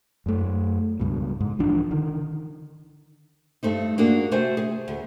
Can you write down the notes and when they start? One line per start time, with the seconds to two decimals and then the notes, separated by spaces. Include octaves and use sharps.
0.26 F#2 A3
1.00 C#2 G2 B2
1.41 G#2
1.59 B1 E3 F3 D4
1.91 D3 D#3
3.63 G2 A3 C4 D#4
3.98 A#3 D4 F#4 G#4
4.32 C3 A3 F#4 C5 G#5
4.57 G#4
4.88 D2